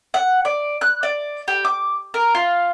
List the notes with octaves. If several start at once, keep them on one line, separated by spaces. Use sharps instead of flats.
F#5
D5
F#6
D5
G4
D6
A#4
F4